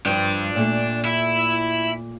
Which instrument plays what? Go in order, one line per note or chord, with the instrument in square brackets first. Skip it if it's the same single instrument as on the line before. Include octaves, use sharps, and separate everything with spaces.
[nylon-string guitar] G2 F3 [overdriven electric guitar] D4 G5
[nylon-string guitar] A#2 A3
[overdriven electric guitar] E4 E5